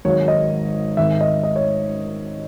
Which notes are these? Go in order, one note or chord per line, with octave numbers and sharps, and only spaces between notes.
G#1 G#2 D#3 F#3 C#5
D#5
G#1 G#2 D#3 E5
D#5
D#5
C#5